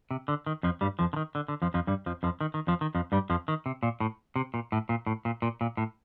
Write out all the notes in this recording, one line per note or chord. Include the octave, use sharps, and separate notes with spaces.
C3
D3
D#3
F2 F3
G2 G3
F2 F3
D3
D#3
D3
D3
F2 F3
F2 F3
G2 G3
F2 F3
F2 F3
D#3
D#3
F2 F3
D#3
F2 F3
G2 G3
F2 F3
D#3
C3
A#2
A2
C3
A#2
A2
A#2
A2
A#2
A#2
A#2
A2